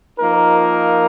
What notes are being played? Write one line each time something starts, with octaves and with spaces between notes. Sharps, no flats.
F3 A#3 D#4 A#4